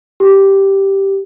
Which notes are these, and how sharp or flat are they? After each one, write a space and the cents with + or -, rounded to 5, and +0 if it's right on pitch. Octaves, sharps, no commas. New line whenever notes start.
G4 -5